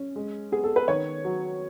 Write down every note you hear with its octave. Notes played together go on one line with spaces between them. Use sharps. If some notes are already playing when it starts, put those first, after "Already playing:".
Already playing: C#4
G#3
B3 G#4
A4
B4
D#3 C#5
F#3